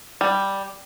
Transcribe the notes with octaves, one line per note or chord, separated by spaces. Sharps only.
G3